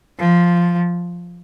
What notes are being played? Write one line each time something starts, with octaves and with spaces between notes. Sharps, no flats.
F3